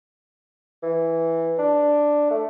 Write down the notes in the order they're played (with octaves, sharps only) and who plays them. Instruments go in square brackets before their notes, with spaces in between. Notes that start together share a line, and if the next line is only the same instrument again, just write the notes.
[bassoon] E3
D4
A3